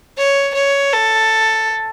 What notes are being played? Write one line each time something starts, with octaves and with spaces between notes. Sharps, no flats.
C#5
C#5
A4